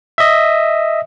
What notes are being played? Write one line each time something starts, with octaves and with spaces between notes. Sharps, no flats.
D#5 E5